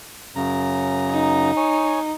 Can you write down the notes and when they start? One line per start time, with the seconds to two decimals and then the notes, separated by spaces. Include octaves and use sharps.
0.36 F#2 C#3 A#5
1.10 D#4
1.57 C#5 G#5